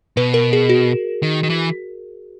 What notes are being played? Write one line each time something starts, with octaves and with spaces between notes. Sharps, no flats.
B2 B4
A#4
G#4
F#4
D#3
D#3
E3